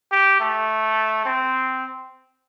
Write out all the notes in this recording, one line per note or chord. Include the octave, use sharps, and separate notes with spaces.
G4
A3
C4